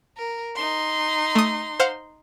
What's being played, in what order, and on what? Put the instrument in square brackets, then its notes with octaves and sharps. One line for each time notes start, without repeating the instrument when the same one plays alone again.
[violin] A#4
D#4 C6
[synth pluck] A3 D#6
C5 F5 F#5